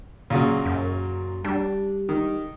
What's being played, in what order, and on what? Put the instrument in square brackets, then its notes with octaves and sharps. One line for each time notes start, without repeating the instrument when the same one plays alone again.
[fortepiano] A#2 C#3 F#3
[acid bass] F#2
[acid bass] G3 [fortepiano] D4
[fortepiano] D#3